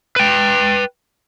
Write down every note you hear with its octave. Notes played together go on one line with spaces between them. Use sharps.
B4 G5